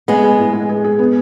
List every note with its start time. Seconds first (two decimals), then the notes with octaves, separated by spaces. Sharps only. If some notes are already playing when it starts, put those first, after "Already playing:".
0.08 G#3 B3 G#4
0.24 G#4
0.39 A2
0.53 G#3
0.69 G#4
0.84 G#4
0.99 B3